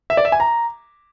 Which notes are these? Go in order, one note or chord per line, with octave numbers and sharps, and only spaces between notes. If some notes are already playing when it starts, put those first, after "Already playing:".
E5
D5
E5
G#5
A#5